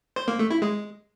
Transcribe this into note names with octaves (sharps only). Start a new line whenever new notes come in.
C5
A#3
A3
E4
G#3